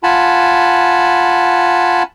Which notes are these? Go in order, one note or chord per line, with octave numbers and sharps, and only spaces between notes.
F4 F#5 G#5 A5 B5